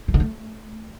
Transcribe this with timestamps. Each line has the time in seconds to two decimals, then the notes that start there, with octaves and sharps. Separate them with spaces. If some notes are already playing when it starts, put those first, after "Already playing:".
0.08 E3
0.14 D3
0.20 A3